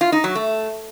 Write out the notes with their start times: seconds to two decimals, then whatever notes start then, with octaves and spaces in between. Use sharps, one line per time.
0.01 F4
0.12 D#4
0.24 F#3
0.35 A3